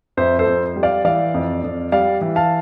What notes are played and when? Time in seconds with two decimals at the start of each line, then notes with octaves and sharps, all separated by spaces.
0.17 F2 C5 E5
0.39 A4 C5
0.47 F2
0.76 G3
0.83 D5 F5
1.05 E3 D5 F5
1.34 F2
1.63 F2
1.92 G3 D5 F5
2.21 E3
2.36 F5 A5